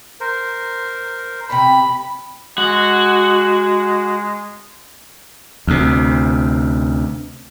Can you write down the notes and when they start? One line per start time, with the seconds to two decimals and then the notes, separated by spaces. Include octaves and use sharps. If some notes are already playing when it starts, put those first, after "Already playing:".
0.20 A#4 C5
1.50 C3 C4 A5 B5
2.58 G#3 F#4
5.67 D2 C3